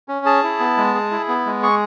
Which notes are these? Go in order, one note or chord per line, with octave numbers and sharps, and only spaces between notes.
C#4
G#4 A5
E4
B3
G#3
G#4
E4
B3
G#3
G#4 C#6